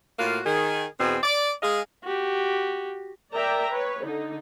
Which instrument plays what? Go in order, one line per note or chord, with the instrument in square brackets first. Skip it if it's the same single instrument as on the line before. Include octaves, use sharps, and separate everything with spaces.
[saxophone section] A2 A#3 F4 F#4
D#3 G#4
E2 B2 C4 G#4
D5
G#3 G#4 D#5 F5
[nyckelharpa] F#4 G4
[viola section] A#4 D5 E5 G5 A#5
B4 C#5
D3 D#4